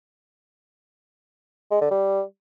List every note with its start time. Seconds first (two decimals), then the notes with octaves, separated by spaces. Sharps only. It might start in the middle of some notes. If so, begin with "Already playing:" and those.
1.71 G#3
1.81 D3
1.91 G3